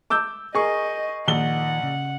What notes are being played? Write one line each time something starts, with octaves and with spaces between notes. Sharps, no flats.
D6 E6 G6
G#4 A#4 D#5 C#6
A#1 D#3 F#5 G7
C#3